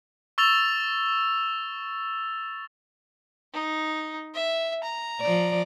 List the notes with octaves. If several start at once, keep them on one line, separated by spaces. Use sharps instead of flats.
C#6 E6 A6 F7
D#4
E5
A#5
F3 D5